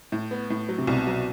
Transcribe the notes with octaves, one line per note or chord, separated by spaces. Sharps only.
A2
B3
A2
F#3
C3
C2 B2
F#3